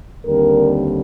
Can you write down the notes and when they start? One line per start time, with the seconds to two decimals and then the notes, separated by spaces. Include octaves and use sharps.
0.25 D#2 D3 G3 C4 A#4